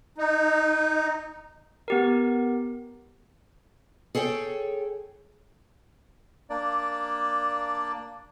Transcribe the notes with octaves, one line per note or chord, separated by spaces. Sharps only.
D#4
B3 G4 A#4
G#4 A4 C#5 G5
A#3 D4 D5